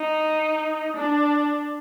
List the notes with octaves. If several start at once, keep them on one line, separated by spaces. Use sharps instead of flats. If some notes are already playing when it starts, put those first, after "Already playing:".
Already playing: D#4
D4